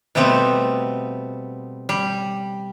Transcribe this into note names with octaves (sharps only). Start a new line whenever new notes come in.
B2 G3 A3 B3 C4
G3